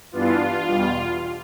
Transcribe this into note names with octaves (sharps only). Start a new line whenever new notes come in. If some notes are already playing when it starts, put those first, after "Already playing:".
G2 E3 B3 D4 F4
E2 B2 G3